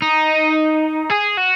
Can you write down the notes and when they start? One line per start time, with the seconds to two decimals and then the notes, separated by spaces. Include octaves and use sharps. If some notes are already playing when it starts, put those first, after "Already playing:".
0.02 D#4
1.10 G#4
1.37 F#4